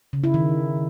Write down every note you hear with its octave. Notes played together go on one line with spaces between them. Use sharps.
C#3
E4
D#3